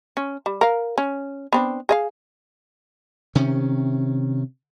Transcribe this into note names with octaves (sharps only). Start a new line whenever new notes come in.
C#4
G3
A#4 F5
C#4
B3 C4 D4
G#4 D#5 F5
C3 D#3 C#4